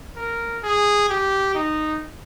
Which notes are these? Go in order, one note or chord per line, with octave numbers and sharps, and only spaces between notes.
A#4
G#4
G4
D#4